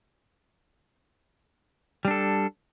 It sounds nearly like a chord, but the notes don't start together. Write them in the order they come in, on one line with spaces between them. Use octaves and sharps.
G3 D4 A4